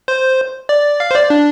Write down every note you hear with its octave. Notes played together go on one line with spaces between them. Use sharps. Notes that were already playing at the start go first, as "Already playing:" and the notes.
C5
D5
F5
C5
D5
D4